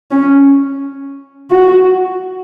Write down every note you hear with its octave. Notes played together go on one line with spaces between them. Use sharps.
C#4
F#4